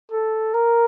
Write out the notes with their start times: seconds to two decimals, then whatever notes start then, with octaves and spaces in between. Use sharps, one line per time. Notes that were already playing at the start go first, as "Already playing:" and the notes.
0.12 A4
0.54 A#4